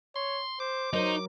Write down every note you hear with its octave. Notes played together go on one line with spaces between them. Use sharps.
C#5 C6
C5 D6
F#3 D#4 A#4 C5 C#5